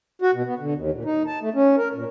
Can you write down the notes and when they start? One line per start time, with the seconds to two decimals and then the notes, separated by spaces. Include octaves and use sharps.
0.22 F#4
0.34 B2
0.46 B3
0.59 D3
0.75 D#2
0.92 A#2
1.05 D#4
1.27 A5
1.41 A3
1.55 C#4
1.77 A#4
1.94 A#2